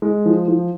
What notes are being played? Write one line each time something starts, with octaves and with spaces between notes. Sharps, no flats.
G#3
F3
F3